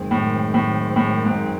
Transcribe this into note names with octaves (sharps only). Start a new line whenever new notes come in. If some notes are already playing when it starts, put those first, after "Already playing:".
Already playing: F#2 D#3 G#3 C4
A2
A2
A2
G#2